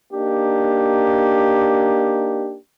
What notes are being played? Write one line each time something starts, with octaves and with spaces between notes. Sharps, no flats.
A#3 D4 D#4 G4